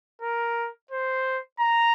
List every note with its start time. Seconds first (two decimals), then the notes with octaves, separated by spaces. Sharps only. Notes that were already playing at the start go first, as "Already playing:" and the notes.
0.22 A#4
0.91 C5
1.60 A#5